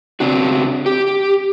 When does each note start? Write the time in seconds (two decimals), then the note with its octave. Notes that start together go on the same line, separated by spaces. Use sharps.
0.20 C#3 C4 D4 F#4
0.86 G4